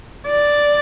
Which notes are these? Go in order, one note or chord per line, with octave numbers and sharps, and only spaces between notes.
D5